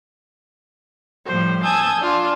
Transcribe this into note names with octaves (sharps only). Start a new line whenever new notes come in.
A2 F3 G3 C5
G#5 A5 D#6 E6 G6 G#6
D4 F4